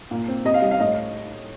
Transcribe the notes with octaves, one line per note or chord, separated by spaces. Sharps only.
A#2
C4
C3 D#5
F5
G3 D#5
F5
A2 D#5